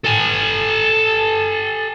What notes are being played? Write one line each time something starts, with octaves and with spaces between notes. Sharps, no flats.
A4 G#5